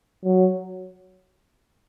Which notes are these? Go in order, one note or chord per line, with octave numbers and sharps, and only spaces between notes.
F#3